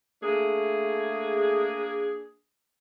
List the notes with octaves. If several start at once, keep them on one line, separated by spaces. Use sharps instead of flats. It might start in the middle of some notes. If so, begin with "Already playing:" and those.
A3 A#3 D4 G#4